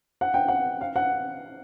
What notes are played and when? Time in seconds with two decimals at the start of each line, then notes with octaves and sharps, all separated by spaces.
0.21 F#5
0.34 G5
0.48 F#5
0.81 F5
0.96 F#5